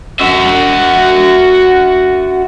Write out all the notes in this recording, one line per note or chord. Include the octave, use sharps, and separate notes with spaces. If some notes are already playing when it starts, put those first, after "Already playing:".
F#4 E5